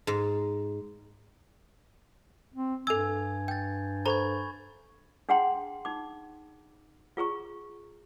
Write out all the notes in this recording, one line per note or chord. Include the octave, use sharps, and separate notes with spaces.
G#2
C4
G2 A4 G#5 E6 G#6
G5 G6 A6
A4 C5 A#5 B5 C#6 G#6
D4 G#4 F#5 G5 A#5 C6
D#4 D6
F4 G#4 A#5 C#6